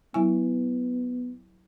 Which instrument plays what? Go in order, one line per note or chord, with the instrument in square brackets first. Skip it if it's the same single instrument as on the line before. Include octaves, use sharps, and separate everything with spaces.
[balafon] F#3 E4 G#5 [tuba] B3